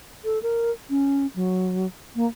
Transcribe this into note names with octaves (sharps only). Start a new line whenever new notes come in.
A4
A#4
C#4
F#3
A#3